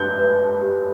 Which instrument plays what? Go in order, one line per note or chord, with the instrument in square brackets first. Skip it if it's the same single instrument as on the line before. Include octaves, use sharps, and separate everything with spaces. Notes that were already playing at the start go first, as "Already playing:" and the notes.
Already playing: [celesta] B4 [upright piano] G6
[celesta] B4
G4